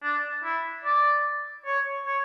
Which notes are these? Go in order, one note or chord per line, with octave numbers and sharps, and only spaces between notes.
D4
E4
D5
C#5
C#5